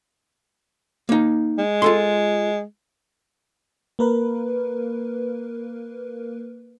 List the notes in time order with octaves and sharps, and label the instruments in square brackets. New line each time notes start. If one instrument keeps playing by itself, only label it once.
[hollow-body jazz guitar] A#3 D#4
[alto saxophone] G#3
[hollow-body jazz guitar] F4 A4 C6
[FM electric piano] A#3 A#4 B4